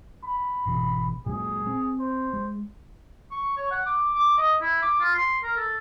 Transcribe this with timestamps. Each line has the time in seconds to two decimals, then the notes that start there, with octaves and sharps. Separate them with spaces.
0.24 B5
0.65 G#1 B2 E3
1.26 A#2 F#3 G#3 G#4
1.67 C4
2.00 C5
2.33 G#3
3.31 C#6
3.57 C#5
3.71 F#5
3.86 D6
4.15 D6
4.38 D#5
4.62 E4
4.82 D6
5.01 F4
5.15 C6
5.44 A#4
5.57 A4